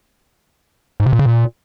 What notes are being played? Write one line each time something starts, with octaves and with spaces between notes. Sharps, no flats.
G#2
C3
A#2
C#3
A#2